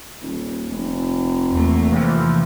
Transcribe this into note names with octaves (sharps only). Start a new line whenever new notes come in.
D#1
F1
E2 A3 A#3
C3 E3 F3